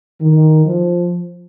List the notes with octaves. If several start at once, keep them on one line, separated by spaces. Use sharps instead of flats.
D#3
F3